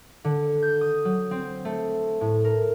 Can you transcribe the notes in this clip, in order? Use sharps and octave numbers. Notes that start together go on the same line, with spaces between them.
D3
G6
D#6
F#3
C4
A3
A2
A#4